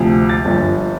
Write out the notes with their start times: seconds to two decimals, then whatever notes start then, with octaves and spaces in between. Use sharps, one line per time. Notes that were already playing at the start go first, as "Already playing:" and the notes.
Already playing: D2 C3 F3
0.29 A6
0.45 G1 G2 F3